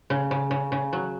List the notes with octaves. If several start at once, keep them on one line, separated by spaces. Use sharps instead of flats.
C#3
C#3
C#3
C#3
F#3